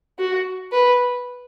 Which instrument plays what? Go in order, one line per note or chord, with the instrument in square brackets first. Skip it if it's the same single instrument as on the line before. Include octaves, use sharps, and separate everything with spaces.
[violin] F#4
B4